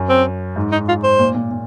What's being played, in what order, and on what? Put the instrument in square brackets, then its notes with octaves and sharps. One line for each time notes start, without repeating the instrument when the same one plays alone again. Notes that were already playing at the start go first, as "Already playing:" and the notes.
Already playing: [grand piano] F#2
[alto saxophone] C4
[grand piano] G#2
[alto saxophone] D#4
F4
C5
[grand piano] A#2
A#2
A#2